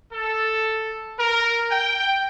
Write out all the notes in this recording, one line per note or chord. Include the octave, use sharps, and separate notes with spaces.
A4
A#4
G5